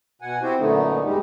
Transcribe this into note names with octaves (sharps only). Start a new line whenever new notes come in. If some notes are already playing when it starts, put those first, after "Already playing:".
B2 F#5 G#5
C4 E4 F#4 G4 C5 G5
F#2 A#2 D3 A3 B3 D#4
E2 G3 G#3 D#4 G4